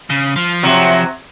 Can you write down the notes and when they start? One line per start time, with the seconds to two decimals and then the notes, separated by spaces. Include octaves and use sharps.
0.10 C#3
0.36 F3
0.63 C3 F#3